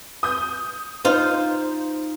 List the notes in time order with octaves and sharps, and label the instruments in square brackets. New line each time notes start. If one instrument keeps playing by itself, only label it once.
[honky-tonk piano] D#6 G6
[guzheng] D#4 F4 [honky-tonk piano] C5